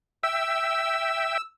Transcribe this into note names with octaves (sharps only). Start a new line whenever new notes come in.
E5 G5 E6